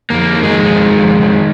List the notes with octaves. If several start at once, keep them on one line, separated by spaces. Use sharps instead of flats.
F2 A#3
D#3
G#3
F2
D#3
F2
D#3